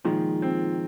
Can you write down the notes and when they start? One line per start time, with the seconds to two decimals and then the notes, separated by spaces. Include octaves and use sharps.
0.05 A#2 D#3 F3 G#3
0.42 C4